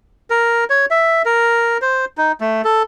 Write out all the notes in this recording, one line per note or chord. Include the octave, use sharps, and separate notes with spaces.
A#4
C#5
E5
A#4
C5
D#4
A3
A4